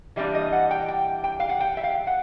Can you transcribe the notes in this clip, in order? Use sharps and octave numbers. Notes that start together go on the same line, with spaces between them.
E3 G3 A#3 D4 E5
D#5
F#5
G5
G5
G5
F5
F#5
G5
E5
F5
F#5